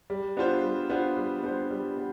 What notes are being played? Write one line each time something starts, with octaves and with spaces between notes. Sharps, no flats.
G3
B3 D4 F4 C5
G3
B3 D4 F4 C5
G3
B3 D4 F4 C5
G3
B3